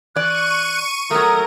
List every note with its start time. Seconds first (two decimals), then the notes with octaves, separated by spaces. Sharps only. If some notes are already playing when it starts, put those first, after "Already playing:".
0.16 E3 D5 C#6 F#6 D#7
1.11 F#3 A3 A#4 A#5 D#6